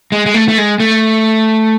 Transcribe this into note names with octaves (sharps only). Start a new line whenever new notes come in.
G#3
G#3
A3
A3
G#3
A3